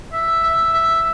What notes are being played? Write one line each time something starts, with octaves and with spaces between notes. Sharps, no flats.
E5
E5
E5